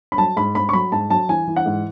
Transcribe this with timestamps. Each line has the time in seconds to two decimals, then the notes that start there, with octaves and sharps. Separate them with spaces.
0.12 B5
0.18 F#3 A5
0.37 G#2 B5
0.55 G#2 B5
0.69 C#6
0.73 F#3 B5
0.92 G#2 A5
1.10 F#3 A5
1.29 E3 G#5
1.47 E3
1.56 F#5
1.66 G#2